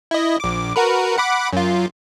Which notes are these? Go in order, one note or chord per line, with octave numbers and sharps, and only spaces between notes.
E4 D#5
A#1 D6
F#4 A#4 B4
F#5 B5 D6
F#2 F4